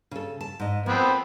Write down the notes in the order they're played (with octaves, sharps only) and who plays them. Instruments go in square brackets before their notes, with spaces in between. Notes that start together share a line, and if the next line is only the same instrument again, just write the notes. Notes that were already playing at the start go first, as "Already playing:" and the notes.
[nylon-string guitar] C#3 A4
A5
G#2 D#5
[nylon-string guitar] F3 [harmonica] B3 C4